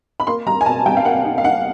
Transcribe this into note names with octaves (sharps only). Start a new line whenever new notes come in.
B5
A#3 C6
G3 A#5
G#5
B2 A5
G3 G5
F5
A#3 F#5
D#4
F5
D#4 F#5